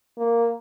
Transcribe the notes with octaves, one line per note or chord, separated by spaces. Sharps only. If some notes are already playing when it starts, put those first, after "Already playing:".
A#3